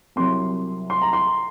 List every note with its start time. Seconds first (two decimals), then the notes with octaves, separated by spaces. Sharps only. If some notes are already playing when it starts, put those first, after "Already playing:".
0.16 C2 C3 F#3 C6
0.90 C6
1.02 A#5
1.13 C6